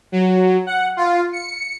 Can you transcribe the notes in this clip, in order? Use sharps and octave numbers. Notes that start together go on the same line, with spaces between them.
F#3
F#5
F4
C#7